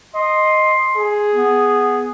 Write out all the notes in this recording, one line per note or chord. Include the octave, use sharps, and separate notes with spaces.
D#5 C6
G#4
B3